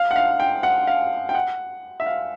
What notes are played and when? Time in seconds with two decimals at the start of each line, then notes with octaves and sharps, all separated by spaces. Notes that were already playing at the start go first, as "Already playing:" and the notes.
Already playing: F5
0.11 F#5
0.16 F5
0.40 G5
0.63 F#5
0.87 F5
1.29 G5
1.35 F#5
2.00 E5
2.06 F5